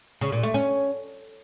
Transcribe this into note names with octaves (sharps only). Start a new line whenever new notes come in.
C#3
A#2
A3
C#4